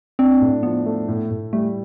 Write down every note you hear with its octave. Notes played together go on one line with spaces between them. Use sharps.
C4 D4
A2
F3 B3
A3
A2
A2
G3 A3